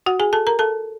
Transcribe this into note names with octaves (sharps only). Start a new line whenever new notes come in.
F#4 F#5
G#4 G#5
A4 A5
A#4 A#5
A4 A5